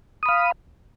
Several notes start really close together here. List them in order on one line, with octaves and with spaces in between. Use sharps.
D#6 B5 F5